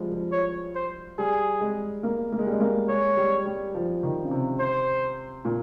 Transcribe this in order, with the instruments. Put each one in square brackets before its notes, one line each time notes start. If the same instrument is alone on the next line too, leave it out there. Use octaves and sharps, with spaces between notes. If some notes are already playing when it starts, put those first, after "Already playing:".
Already playing: [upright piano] F3 G3 G#3
F3
[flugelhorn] C#5
C5
[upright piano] G3 [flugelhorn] G#4
[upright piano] G#3
A#3
A#3
G#3
G3
G#3
A#3
[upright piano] G#3 [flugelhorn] C#5
[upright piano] G3
G3
F3
D#3
C#3
C3
[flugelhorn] C5
[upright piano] A#2